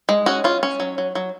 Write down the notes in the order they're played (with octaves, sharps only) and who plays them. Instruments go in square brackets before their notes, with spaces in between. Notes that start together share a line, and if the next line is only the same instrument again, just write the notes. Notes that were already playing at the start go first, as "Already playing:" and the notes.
[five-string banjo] G#3
C#4 F#4
C#4 F4
C#4
F#3
F#3
F#3